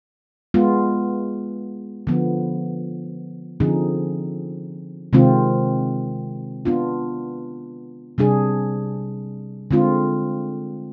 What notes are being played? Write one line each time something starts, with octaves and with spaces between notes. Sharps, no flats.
G#3 B3 F4
D3 F3 B3
D3 F3 C4 D#4 G#4
C3 D#3 G#3 C4 F4
B3 D4 F4
C3 G3 D4 G#4
D3 G#3 C4 F4